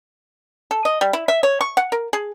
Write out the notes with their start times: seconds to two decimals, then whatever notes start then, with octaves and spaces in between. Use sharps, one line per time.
0.71 A4
0.85 D#5
1.01 G3
1.13 E4
1.28 E5
1.43 C#5
1.61 C#6
1.77 F#5
1.92 A#4
2.13 G#4